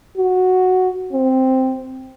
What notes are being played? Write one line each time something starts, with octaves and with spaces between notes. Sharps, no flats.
F#4
C4